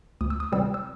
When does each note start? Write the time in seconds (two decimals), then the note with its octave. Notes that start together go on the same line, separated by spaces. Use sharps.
0.21 D2 D#6
0.30 E6
0.40 D#6
0.52 C3 E3 G3 C4 E6
0.74 E6